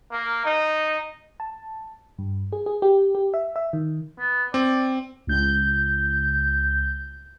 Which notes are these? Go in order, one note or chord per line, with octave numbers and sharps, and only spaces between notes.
A#3
D#4
A5
G2
G#4
G#4
G4
G4
E5
E5
D#3
B3
C4 D5
C#2 G6